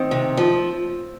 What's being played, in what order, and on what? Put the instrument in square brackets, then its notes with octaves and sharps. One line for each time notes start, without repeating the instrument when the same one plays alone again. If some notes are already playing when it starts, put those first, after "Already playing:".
Already playing: [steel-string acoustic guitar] D#3 [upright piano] C4
[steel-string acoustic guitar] C3
F3